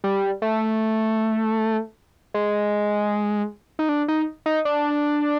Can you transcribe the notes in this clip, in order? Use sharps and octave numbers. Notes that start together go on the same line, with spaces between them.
G3
A3
G#3
D#4
D4
D#4
D#4
D4